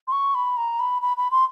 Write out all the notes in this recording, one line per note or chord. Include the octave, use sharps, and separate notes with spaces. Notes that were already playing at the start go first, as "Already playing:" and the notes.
C6
C#6
B5
A#5
B5
B5
B5
C6